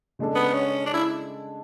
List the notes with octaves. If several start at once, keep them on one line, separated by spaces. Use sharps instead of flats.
C#3 G#3 D4 A4
B3
C#4
D4
E4